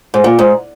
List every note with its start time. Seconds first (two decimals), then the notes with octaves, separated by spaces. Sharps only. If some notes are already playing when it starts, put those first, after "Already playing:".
0.14 G#2
0.24 A#2
0.39 G#2